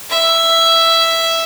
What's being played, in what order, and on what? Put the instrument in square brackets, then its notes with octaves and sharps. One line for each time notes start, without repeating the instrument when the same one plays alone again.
[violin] E5